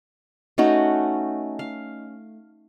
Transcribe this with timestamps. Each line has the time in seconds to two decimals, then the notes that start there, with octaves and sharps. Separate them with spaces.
0.58 A3 C#4 D#4 F#4
1.59 F5